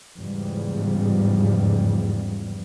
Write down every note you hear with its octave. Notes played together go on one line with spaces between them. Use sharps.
E2 G#2 C#3 F3 G3